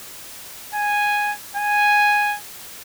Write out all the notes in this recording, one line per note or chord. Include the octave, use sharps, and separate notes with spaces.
G#5
G#5